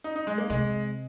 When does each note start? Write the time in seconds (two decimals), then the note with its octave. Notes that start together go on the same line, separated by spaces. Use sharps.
0.04 D#4
0.16 D#4
0.27 G#3
0.38 A#3
0.50 C3 G#3